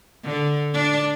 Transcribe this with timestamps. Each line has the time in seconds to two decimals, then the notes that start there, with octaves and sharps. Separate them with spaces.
0.24 D3
0.74 D4